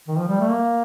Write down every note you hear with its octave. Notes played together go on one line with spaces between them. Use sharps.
D#3
F3
G3
A3
A#3